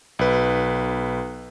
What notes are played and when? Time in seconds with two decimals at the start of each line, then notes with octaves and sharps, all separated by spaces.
0.19 B1 B4